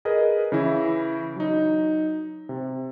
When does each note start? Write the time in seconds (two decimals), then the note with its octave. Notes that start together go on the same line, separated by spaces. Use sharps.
0.05 G#4 A#4 B4 D#5
0.52 C#3 E3 E4
1.36 F#3 D#4
2.49 C3